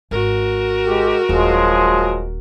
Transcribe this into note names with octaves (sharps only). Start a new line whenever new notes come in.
G#1 F#4 A#4
G#3 G4
D#1 F3 F#3 G#3